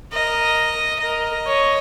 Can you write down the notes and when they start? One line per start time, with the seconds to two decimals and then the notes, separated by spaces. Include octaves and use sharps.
0.13 A#4 D#5
1.01 A#4 D#5
1.46 C#5